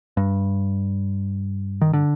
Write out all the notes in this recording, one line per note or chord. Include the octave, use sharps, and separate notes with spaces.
G2
D#3
D3